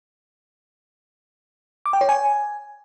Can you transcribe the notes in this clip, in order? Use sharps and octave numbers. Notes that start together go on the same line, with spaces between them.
D6
G5
C#5
G#5